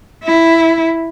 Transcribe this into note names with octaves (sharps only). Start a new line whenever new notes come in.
E4